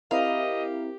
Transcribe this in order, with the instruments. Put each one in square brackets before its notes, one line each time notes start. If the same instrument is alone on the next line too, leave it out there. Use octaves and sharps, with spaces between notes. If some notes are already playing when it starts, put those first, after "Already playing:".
[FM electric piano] C4 E4 A#4 [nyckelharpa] G4 [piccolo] D#5 [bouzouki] F5